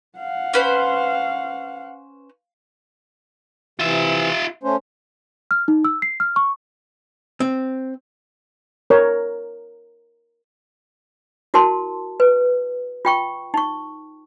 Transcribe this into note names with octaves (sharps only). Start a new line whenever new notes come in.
F5 F#5
C#4 B4 C5
C3 E3 F4 E5
A3 C#4 C5
F6
D#4
E6
C7
F6
C#6
C4
A#4 C#5
E4 F#4 A#4 A5 C6
B4
F4 G5 C#6
D#4 C#6